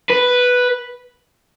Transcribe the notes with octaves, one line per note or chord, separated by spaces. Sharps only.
B4